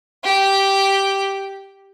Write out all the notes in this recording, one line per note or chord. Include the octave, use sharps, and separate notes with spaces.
G4